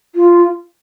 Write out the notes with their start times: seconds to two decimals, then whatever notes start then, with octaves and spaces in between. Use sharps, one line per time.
0.15 F4